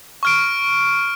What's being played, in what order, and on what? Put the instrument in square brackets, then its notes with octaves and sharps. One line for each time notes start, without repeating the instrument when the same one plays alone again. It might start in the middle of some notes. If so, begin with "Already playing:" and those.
[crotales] C#6 F6 D7